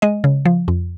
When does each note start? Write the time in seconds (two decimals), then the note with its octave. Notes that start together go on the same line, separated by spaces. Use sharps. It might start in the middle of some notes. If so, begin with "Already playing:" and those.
0.02 G#3 D#5
0.24 C#3
0.45 F3
0.68 F2